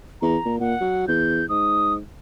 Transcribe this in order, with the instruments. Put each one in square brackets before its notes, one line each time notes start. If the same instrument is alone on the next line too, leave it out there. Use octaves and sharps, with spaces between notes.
[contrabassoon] E2 [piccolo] A#5
[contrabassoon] A#2
[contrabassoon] A#2 [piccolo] F#5
[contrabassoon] F#3
[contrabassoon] E2 [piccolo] G6
[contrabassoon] G#2 [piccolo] D#6